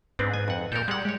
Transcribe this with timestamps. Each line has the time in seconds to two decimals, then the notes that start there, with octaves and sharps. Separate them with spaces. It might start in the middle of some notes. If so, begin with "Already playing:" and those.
0.19 G#2 B3 C4 D4 B4
0.34 G#5
0.48 F2 F#5
0.72 A#2 A4 A#4 G6
0.88 G3 G#3 F#5
1.05 G#3 G4 C#5